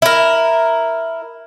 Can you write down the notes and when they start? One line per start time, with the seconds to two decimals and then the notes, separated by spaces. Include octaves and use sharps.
0.02 E4 A#4